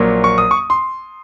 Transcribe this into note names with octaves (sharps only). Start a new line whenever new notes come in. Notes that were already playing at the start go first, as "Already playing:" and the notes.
Already playing: A#1 A#2 F#3 A#3
C#6
D#6
C#6
C6